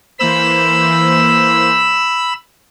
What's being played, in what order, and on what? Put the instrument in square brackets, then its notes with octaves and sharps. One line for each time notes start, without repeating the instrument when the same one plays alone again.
[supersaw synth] E3 A#3 C5 [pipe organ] B5 E6